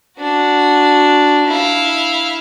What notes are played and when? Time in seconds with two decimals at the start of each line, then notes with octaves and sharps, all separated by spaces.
0.19 D4 F#4
1.47 E4 F5